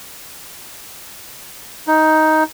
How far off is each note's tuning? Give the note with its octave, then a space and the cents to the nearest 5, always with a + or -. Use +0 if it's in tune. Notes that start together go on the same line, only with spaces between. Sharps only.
D#4 +10